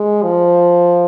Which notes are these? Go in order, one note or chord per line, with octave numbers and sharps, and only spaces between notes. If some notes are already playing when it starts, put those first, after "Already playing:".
Already playing: G#3
F3